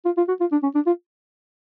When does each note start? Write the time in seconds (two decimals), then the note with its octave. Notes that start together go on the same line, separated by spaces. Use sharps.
0.05 F4
0.17 F4
0.28 F#4
0.40 F4
0.52 D4
0.63 C#4
0.75 D4
0.86 F4